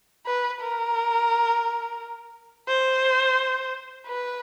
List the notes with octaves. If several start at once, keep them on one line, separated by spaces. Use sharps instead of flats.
B4
A#4
C5
B4